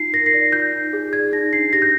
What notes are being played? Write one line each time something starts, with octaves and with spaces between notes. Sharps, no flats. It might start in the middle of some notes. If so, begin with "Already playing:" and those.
Already playing: D#4 F4 C7
A#4 A#6
C7
D5 A#6
F4 G6
D#4
G#4
D5 G#6
D#4 A#6
D4 C7
G4 A#6
G6